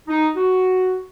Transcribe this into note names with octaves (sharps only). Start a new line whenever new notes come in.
D#4
F#4